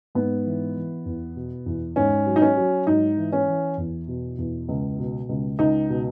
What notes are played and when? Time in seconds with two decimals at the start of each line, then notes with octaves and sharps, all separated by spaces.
0.15 G#2 B3
0.45 E3
0.76 E3
1.06 E2
1.36 B2
1.66 E2
1.96 G#2 C#4
2.26 F#3
2.36 D#4
2.42 C#4
2.57 F#3
2.87 G#2 D#4
3.17 E3
3.32 C#4
3.48 E3
3.78 E2
4.08 B2
4.38 E2
4.69 C#2
4.98 B2
5.29 C#2
5.59 C#2 D#4
5.89 B2